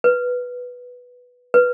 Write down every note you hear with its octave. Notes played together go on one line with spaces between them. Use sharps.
B4
B4